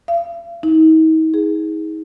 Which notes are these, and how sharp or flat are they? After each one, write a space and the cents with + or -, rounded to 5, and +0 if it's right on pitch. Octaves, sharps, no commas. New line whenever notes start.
F5 -45
D#4 +40
G#4 +0